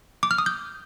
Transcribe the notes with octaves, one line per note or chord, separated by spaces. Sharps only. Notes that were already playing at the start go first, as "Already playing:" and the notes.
D6
F6
D#6
G6